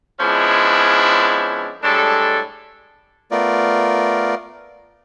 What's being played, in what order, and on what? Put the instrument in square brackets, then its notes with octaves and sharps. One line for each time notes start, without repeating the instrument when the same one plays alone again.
[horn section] F3 G#3 B3 C#4 D4 E4
A2 G3 G#3 D4 A4
[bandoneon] A3 B3 F4 A#4 D5